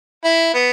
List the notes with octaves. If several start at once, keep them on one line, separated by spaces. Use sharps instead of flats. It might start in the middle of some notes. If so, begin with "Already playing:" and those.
E4
B3